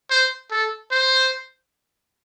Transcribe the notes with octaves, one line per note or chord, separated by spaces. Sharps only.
C5
A4
C5